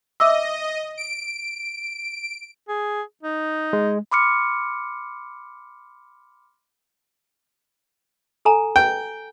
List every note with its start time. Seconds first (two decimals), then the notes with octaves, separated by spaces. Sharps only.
0.20 D#5 E5 D6 E6
0.97 D7
2.69 G#4
3.23 D#4
3.73 G#3
4.11 B5 C6 D6 F6 C#7
8.45 A4 G#5 A#5
8.76 G5